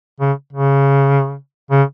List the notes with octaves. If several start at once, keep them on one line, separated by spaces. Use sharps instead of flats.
C#3
C#3
C#3